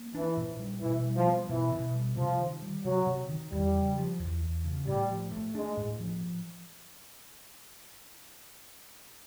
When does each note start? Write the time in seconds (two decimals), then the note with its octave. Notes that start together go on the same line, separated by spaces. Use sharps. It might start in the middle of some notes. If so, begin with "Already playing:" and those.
Already playing: A#3
0.15 E3 D4
0.37 A#2
0.59 G3
0.81 B2 E3
1.05 G3
1.16 F3
1.27 B3
1.49 B2 E3
1.72 B2
1.95 G3
2.17 C3 F3
2.39 D#3
2.62 G3
2.84 C3 F#3
3.07 C3
3.29 D#3
3.52 E2 G3
3.75 C#3
3.97 F3
4.19 E2
4.41 E2
4.64 C#3
4.87 A2 G3
5.09 F3
5.31 A3
5.54 G#3 D4
5.77 A2
6.00 F3